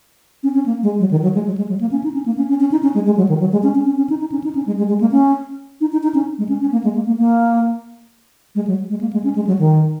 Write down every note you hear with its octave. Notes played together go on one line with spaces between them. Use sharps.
C#4
C#4
A#3
G#3
F#3
D#3
F#3
G#3
F#3
G#3
F#3
A#3
C#4
D#4
C#4
A#3
C#4
C#4
C#4
D#4
C#4
G#3
G#3
F#3
D#3
F#3
G#3
C#4
C#4
C#4
C#4
D#4
D#4
C#4
D#4
C#4
G#3
G#3
G#3
A#3
C#4
D#4
D#4
D#4
C#4
G#3
C#4
C#4
A#3
G#3
A#3
A#3
A#3
G#3
F#3
G#3
A#3
G#3
C#4
G#3
F#3
D#3